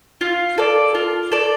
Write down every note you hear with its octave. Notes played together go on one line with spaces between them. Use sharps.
F4
A4 D5
F4
A4 D5